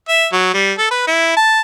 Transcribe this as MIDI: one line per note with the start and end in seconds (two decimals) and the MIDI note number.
0.08 0.27 76
0.32 0.50 54
0.54 0.73 55
0.78 0.89 69
0.91 1.06 71
1.08 1.36 64
1.37 1.61 81